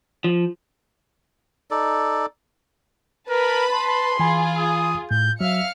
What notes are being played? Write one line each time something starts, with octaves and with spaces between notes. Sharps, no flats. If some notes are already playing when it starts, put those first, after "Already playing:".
F3
D#4 A4 D5
A#4 B4 A5 B5
C6
E3 F4 G#4 G#5 B5
D#6
A2 G6
F#3 E5 F5 F6 C#7